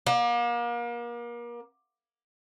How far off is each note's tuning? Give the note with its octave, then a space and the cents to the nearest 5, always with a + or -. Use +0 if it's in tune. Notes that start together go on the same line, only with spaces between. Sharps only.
A#3 +35